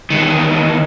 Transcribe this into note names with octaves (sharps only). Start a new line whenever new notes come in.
E2 D#3